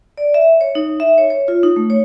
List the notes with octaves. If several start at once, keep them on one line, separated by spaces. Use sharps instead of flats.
D5
E5
C#5
D#4
E5
C#5
C#5
F4
D#4
A3
C#5